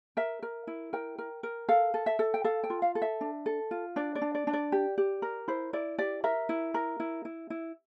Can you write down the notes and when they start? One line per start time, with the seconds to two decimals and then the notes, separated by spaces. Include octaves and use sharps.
0.17 A#4 E5
0.43 A#4
0.67 E4
0.93 A#4 G5
1.18 A#4
1.43 A#4
1.69 A4 F5
1.94 A4
2.06 E5
2.19 A4
2.34 G5
2.44 A4 F5
2.64 G5
2.70 F4
2.82 F5
2.95 A4
3.02 E5
3.21 D4
3.46 A4
3.71 F4
3.96 D4 D5
4.15 D5
4.22 D4
4.35 D5
4.47 D4
4.53 D5
4.72 G4
4.98 G4
5.22 A#4
5.48 E4 C5
5.73 E4 D5
5.98 G4 D5
6.24 A#4 E5
6.49 E4
6.74 A#4
7.00 E4
7.25 E4
7.50 E4